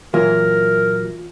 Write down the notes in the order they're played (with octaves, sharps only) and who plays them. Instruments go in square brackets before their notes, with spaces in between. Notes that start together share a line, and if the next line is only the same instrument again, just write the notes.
[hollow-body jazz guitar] A#2 F#3 [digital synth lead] E3 [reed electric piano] F4 [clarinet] A#4